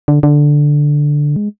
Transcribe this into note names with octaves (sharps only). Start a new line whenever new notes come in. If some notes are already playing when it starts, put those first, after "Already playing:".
D3
D3
G#3